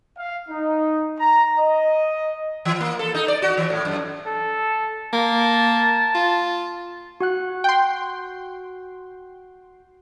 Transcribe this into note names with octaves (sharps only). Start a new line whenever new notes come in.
F5
D#4
A#5
D#5
E3
A#3
A4
D#4
D5
F#4
E3
A2
F#2
A4
A#3 A5
F4
F#4 F#5 F#6
G5 C6